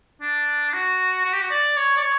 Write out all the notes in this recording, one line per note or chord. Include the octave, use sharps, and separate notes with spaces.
D4
F#4
F#4
G4
F#4
D5
C#5
D5
C#5